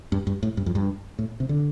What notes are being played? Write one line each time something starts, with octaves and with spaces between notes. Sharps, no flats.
G2
G2
A2
G2
F2
G2
A2
C3
D3